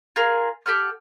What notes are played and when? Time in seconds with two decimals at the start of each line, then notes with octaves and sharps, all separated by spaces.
0.16 F4 G#4 A#4
0.66 G4 A4 F#5 F6